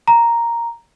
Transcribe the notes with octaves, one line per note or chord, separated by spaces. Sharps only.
A#5